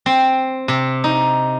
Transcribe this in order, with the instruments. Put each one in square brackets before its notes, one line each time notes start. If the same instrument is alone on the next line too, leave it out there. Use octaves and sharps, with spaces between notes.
[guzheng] C4
C3
D#4